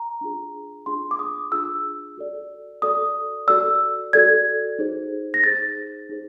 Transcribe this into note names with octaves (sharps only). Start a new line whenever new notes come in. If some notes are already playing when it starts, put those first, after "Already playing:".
Already playing: A#5
D4 F4 G#4
D4 F4 G#4 C6
D6
D#6
D4 F4 G#4 E6
F#4 A4 D5
F#4 A4 D5 D#6
F#4 A4 D5 E6
F#4 A4 D5 G#6
D#4 G#4 C5
A#6
D#4 G#4 C5 A6
D#4 G#4 C5